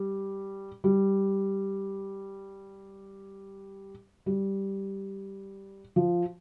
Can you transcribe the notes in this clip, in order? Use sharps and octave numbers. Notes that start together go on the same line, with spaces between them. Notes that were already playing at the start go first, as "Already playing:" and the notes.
Already playing: G3
G3
G3
F3